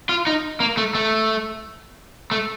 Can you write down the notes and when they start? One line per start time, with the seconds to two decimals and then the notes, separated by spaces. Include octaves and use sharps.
0.09 F4
0.27 D#4
0.60 A#3
0.77 A3
0.95 A3
2.31 A3